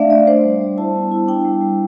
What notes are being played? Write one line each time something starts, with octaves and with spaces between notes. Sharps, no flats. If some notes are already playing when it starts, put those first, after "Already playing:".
Already playing: A3 D4 D5 E5 F5
A3 D5
D4 C5
G3
G3
E4 A5
B3
E4
D4 G5
G3
G3